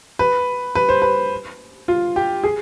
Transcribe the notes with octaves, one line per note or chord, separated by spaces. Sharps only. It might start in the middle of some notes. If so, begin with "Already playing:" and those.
B4
B4
C5
B4
F4
G4
G#4